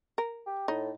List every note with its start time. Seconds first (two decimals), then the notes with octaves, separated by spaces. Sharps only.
0.18 A#4
0.46 G4
0.68 A2 D#4